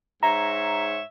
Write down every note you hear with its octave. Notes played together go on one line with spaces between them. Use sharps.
G#2 C#5 E5 A#5